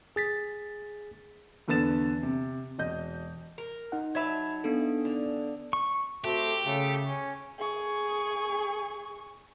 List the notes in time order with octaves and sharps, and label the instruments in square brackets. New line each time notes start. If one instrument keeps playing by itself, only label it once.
[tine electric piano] G#4 A6 B6
[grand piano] E2 D3 B3 A6 E7
C3
E1 D#5 G6
[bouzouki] A#4
[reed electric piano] D#4 F#5
[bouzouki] F#3 E5 A5 [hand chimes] B5 G#6
[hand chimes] B3 D4 A4
[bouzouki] D3
[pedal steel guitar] C#6
[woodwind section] A3 F#4 [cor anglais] C4 [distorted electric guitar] G4
[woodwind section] C#3 [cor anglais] A3
[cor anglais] C#4
[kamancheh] G#4 C#6